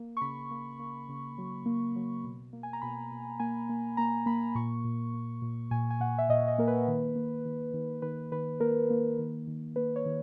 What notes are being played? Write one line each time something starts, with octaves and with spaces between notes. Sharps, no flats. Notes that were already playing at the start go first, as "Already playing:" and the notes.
Already playing: A#3
C#6
C#3 B5
A#3
A#3
C#3
F#3
A#3
F#3
B2
A#3
G#5
A#5
B2 B5
B2
A#3 G#5
A#3
A#3 A#5
A#3 B5
A#2 C#6
A#2
A#3
A#2
A#2 G#5
G#5
A#2 F#5
E5
A#2 D#5
D#5
A#3 A#4
B4
D#3
A#3
D#3
D#3
D#3 B4
D#3 B4
A#3 A#4
A#3
D#3
D#3
A#3 B4
C#5
D#3